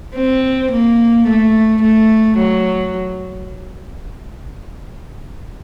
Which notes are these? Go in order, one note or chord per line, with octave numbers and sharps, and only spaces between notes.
C4
A#3
A3
A3
F#3